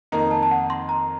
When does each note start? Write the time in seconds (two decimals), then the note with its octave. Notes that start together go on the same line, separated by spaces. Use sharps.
0.12 F2 D#3 A#3 D#4 A#5
0.31 A5
0.43 A5
0.51 F#5
0.70 C6
0.89 A#5